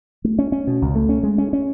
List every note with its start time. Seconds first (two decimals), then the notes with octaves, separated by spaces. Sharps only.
0.24 A3
0.39 C#4
0.52 C#4
0.67 B2
0.82 C#2
0.95 A3
1.09 C#4
1.23 G#3
1.38 C#4
1.53 C#4